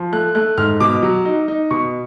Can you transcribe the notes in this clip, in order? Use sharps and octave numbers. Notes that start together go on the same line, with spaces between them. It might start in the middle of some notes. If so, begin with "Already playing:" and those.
Already playing: F3
A3 F#6
A3 F#6
G#2 F6
B2 D6
F#3
D#4
D#4
B2 C#6